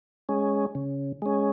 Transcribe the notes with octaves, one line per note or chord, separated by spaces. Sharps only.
G#3 C#4
C#3
G#3 C#4